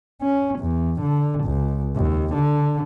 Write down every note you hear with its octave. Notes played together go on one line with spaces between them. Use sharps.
C#4
E2
D3
C#2
D#2
D3